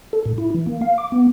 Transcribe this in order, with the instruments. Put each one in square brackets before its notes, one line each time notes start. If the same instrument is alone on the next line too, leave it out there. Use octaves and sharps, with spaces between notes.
[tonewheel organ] A4
A2
E4
E3
A#3
F5
D6
B3